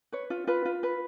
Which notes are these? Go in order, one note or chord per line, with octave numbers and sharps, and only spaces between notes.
B4 C#5
F4
F4 B4
F4
B4